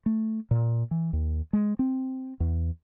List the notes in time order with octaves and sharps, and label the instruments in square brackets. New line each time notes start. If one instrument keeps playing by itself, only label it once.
[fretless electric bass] A3
A#2
E3
D#2
G#3
C4
E2